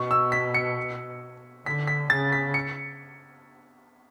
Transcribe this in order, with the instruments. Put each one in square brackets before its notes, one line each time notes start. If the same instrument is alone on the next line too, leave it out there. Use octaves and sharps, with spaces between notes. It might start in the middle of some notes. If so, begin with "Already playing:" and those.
Already playing: [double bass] B2 [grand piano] C#6
[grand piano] E6
B6
C#7
[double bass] D3 [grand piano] B6
[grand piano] B6
[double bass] C#3 [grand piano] A6
[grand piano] B6
C#7